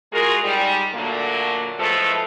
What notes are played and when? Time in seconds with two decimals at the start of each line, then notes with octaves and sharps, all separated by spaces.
0.13 G#3 F4 F#4 G#4 A#4
0.44 G#2 G3
0.94 A#2 D3 F#3 A3 A#3
1.79 A2 F3 G#3 A3 A4 B4